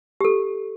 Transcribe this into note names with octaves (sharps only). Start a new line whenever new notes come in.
G4
A4